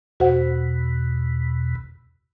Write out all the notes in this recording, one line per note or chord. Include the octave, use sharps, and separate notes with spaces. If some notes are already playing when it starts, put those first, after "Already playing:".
E2 B2 F#4 C5 F#5